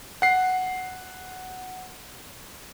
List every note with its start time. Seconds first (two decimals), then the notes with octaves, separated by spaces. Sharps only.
0.22 F#5 C7